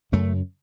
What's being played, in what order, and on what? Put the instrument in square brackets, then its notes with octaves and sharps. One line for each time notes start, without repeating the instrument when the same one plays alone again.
[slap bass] F#2 C#3 A3